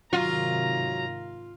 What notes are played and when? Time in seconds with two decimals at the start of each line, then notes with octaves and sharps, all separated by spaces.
0.13 G#2 C3 D#3 F#3 F4 A#5